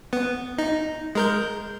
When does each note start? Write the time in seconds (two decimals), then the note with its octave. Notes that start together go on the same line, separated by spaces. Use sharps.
0.13 B3
0.58 D#4
1.15 G#3 A#4 G6